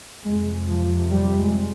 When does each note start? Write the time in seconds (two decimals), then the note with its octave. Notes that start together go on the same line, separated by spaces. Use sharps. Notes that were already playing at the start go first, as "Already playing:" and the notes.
0.24 F2 C3 G#3
0.67 F3
1.10 G3
1.38 G#3